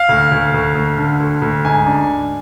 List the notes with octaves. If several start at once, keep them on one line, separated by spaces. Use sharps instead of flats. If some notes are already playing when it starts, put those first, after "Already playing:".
Already playing: F5
D2
D2
D2
D2
D3
D2
D2
G#2 G#5
D4